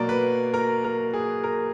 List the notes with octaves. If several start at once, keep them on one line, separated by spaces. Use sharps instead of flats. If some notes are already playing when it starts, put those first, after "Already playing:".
Already playing: B2 F#3 A#3 D5
B4
A#4
A#4
G#4
A#4